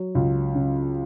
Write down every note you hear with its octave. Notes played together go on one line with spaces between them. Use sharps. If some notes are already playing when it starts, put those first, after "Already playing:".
Already playing: F#3
C#2
C#3